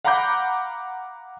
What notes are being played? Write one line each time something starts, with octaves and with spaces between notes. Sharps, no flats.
F5 F#5 A#5 B5 D6 G6